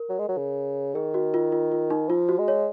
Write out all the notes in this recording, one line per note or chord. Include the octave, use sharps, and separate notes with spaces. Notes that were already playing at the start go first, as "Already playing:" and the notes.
Already playing: A#4
F#3
G#3
F#3
C#3
D#3 G#4
F#4
F4
F4
F4
D#4
F3 F4
F#4
G#3
C#5